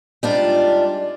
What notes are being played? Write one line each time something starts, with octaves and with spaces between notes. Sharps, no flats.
G3 G#3 D4 D#4 F4